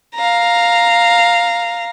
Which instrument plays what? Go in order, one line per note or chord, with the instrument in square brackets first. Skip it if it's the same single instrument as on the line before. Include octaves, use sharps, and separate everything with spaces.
[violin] F5 A#5